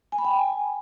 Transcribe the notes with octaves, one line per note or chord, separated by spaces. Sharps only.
G#5
B5
G5
G#5